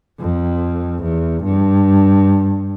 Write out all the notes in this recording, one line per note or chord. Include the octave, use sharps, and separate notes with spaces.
F2
E2
G2